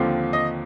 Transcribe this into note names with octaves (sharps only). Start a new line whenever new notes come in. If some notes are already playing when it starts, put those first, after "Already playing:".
Already playing: D#2 D3 F3 C4 F4
D#5